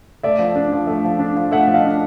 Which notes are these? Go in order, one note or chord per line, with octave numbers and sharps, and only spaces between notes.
A3 D5 E5
F3
D4
F3
A3
F3
D4
F3
A3 E5 F#5
F3
D#5 F5
D4